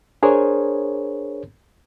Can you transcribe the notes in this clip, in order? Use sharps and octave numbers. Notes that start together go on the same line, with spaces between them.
D4 G#4 A#4 C5 C#5